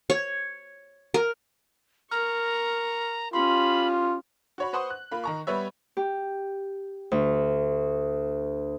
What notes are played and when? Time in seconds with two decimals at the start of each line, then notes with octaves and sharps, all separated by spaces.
0.10 C#5
1.14 A#4
2.11 A#4 A#5 C#6 F6
3.33 C#4 F4 G4 B5 C6
4.58 F#4 C#5 B5
4.73 B4 C5 F#5 C6 C#6 D#6
4.90 F#6
5.12 A#3 F4 B5
5.24 D#3 A#5 C#6
5.47 G3 B3 B4 C#5 E5
5.97 G4
7.12 D2